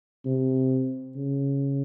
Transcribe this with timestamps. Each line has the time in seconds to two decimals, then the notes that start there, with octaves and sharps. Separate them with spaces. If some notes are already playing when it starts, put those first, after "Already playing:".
0.26 C3
1.16 C#3